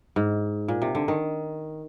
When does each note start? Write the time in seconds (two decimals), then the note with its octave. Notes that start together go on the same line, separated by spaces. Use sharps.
0.16 G#2
0.68 A#2
0.82 C3
0.95 D3
1.08 D#3